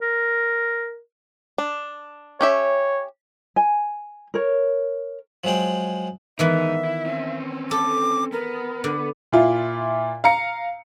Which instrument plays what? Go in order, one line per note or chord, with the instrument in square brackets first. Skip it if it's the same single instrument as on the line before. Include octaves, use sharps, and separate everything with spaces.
[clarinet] A#4
[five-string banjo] D4
[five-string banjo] C#4 G4 E5 [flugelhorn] C#5
[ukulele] G#5
A#4 C#5
[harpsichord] F3 F#3 G#3 G#4 G5
[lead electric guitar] G#2 D#4 [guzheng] D#3 E3 B3 [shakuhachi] E5
[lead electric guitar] E4
C4 C#4
[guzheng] A4 [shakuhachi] D6
[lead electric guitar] B3 [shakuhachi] A#4
[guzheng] D3
[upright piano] A#2 E4 F4
F5 A#5 C#7